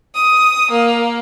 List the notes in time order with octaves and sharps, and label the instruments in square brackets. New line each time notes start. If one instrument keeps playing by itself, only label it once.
[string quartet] D#6
A#3